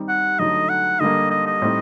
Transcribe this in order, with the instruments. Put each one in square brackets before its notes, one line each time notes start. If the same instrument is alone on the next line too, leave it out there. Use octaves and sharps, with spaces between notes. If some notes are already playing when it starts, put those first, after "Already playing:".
Already playing: [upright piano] D#3 G3 C4 D#4
[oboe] F#5
[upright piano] D3 F#3 A3 D#4 [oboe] D#5
[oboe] F#5
[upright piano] D3 G3 A#3 [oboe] D#5
[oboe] D#5
D#5
[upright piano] A2 G3 C4 D#4